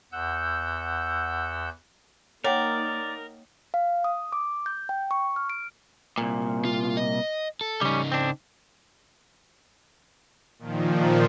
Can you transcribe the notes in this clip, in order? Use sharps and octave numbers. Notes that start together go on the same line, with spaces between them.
E2 F#5 E6 G6
A#3 D#4 A#4 C#5 D5 F#5 G5
F5
D#6
D6
G6
G5
C#6
F6
D7
C2 A#2
F4
D#5
A4
C#3 G3 C#4 D#4
C4 D4
A#2 D#3 F3